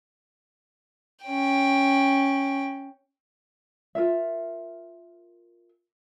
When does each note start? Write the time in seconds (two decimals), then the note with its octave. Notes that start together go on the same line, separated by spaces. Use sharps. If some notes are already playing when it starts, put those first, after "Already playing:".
1.25 C#4 G5
3.95 F4 A#4 E5